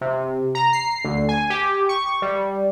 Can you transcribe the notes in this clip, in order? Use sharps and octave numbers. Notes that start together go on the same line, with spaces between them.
C3
A#5
C7
D2
G#5
G4
C#6
G3